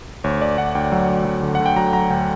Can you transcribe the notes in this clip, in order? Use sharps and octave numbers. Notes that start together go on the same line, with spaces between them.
D2 C#5
D2 D5
D2 F#5
D2 G5
F#3
D2
F#3
D3
D3 F#5
G5
F#3 A#5
F#3 A#5
D2 G5